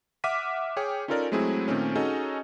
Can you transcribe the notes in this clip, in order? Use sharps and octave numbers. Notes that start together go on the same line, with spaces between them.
E5 F#5 D6 F6 B6 D#7
G#4 C#5 G5 D6
C#4 D#4 F4 A4 A#4 D5
F#3 G#3 A3 C4 E4 G#4
A#2 D#3 A3 C4 C#4
C#4 D#4 F#4 G#4 A4 D#5